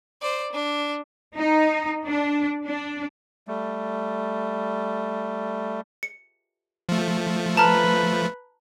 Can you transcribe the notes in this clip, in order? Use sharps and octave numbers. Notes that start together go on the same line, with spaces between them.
C5 D5
D4
D#4
D4
D4
G3 A3
C#7
F3 A3
B4 A5 A#5 F6